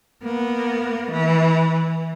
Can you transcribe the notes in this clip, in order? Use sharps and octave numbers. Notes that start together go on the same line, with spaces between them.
A#3 B3
E3